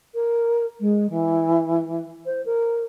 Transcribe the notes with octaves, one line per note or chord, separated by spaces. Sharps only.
A#4
G#3
E3
C5
A#4